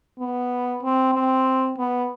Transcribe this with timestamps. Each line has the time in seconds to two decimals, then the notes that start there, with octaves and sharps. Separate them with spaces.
0.19 B3
0.83 C4
1.14 C4
1.78 B3